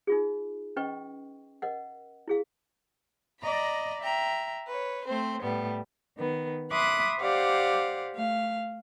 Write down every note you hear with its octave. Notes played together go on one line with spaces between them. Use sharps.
D#4 F4 G#4
C#4 B4 D#5 G5 C#6
A#4 D#5 F#5
E4 G#4 F5
D5 D#5 A#5 B5
E5 G5 A#5
B4 C#5
A3 C4 C5
A2 G3 B3
D#3 B3
E5 B5 C6 D6 D#6 F#6
G4 C5 D5 F5 F#5
A3 F5